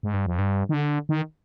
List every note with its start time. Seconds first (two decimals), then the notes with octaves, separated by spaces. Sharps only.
0.03 G#2
0.14 G2
0.26 F2
0.39 G2
0.69 D#3
0.74 D3
1.09 D#3